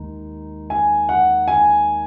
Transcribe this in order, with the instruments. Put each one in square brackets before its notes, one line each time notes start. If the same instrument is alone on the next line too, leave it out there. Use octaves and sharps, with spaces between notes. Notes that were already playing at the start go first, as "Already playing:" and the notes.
Already playing: [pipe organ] D#2 D#3 G#3 D#4
[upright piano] G#5
F#5
G#5